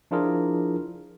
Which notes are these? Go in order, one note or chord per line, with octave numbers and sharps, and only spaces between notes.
F3 D4 E4 F4 G#4 A#4